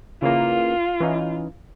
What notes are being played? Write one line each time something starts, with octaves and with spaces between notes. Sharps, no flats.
C#3 E3 A#3 F4
E3 C#4 D#4